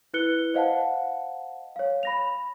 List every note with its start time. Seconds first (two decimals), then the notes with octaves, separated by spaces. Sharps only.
0.14 E4 B4 F#6 C#7 G7
0.54 C5 D#5 F5 F#5 A5
1.76 C#5 F5
2.03 B5 A#6 F7